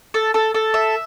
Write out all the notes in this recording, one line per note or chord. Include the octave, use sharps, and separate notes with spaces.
A4
A4
A4
E5